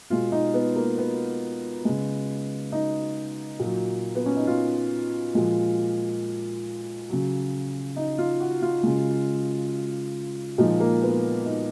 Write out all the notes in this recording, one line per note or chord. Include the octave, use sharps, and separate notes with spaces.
B2 G#3 F4
D#4
B3
A#3
B3
C#3 G#3
D#4
A#2 F#3
B3
C#4
D#4
F4
A#2 F3 G#3
C#3 F#3
D#4
F4
F#4
F4
C#3 G#3
A#2 F3 G#3 D#4
A#3
B3
D#4